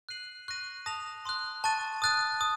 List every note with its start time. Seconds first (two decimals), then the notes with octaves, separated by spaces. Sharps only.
0.09 F#6 C7 D#7 F#7
0.48 C#6 F#6 A#6 D#7
0.86 A5 D#6 A#6 F7
1.25 C6 D#6 F#6
1.64 A5 C#6 F#6 A6 D#7
2.02 D#6 F#6 A6 D#7
2.41 D#6